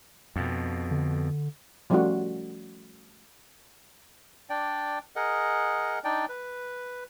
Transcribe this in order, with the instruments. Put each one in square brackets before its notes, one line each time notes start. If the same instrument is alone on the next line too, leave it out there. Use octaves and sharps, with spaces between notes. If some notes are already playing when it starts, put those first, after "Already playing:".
[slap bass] F2 B2
[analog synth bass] D3
[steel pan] F3 G3 A3 C#4 F4 F#4
[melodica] D4 D5 G5
G#4 A#4 D#5 F#5
D4 D#4 D5 G5
B4